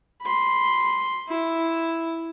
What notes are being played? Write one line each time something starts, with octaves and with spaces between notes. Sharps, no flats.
B5 C6
E4